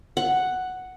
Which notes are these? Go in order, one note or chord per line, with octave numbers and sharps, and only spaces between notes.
F#5